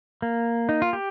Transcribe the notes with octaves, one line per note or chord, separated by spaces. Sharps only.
A#3
D#4
F4
G4